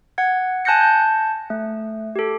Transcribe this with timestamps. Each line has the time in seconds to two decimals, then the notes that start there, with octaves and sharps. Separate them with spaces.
0.18 F#5 G#6
0.65 G#5 A5 F#6 G6 A#6 C#7
0.81 A5 G6
1.50 A3
2.16 G4 A4